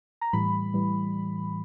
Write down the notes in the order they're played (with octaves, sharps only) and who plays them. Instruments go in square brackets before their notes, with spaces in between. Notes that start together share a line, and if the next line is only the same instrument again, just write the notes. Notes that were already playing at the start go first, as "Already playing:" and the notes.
[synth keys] A#5
A2 E3 G3 B5
A2 E3 G3